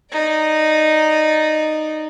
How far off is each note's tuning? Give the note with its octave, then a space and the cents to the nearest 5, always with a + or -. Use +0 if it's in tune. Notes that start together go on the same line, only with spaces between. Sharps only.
D#4 -10 D5 +0